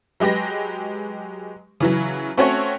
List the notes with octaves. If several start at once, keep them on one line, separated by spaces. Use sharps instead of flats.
F#3 G#3 G4 B4 A#6
C#3 E3 F#3
A3 C4 C#4 F#4 A4 C#5